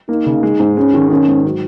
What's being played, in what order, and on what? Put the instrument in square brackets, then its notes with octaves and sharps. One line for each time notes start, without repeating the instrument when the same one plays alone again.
[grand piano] A#3 [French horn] D#4
[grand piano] C#3
G#3
G#2
[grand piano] G#3 [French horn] C#4
[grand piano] D#3
[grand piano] D#3 [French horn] C#4
[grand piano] G#2
F#3